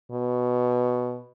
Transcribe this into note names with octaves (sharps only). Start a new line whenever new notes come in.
B2